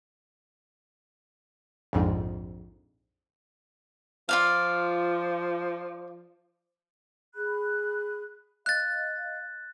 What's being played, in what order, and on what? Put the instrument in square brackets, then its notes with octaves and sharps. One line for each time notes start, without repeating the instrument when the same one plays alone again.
[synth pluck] A#1 F2 G#2
[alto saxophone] F3 [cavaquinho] F4 D5 F5
[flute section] G#4 B5 F#6
[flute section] D#5 F5 [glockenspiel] F#6 A6